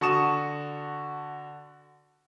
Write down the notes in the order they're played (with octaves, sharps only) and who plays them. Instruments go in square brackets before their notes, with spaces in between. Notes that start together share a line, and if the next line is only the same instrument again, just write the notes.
[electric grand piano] D3 F#4 A5 C#6 D#6 E7